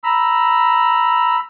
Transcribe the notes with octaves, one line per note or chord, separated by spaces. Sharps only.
A#5 B5 E6